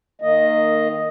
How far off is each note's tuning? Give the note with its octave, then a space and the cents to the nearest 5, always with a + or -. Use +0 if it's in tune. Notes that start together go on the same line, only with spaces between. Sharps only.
D#3 -20 A#3 -20 D#5 +0